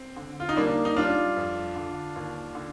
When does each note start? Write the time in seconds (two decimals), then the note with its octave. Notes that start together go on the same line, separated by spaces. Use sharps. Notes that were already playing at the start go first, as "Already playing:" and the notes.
Already playing: C4
0.17 D3
0.40 F4
0.49 D#4
0.56 G3 A#3 D4
0.85 D#4
0.96 G3 D4 F4
1.36 F2
1.76 D3
2.16 D#2
2.55 D3